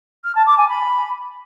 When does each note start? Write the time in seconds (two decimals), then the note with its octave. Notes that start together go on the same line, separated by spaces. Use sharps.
0.24 F6
0.35 A5
0.46 D6
0.58 G#5
0.69 B5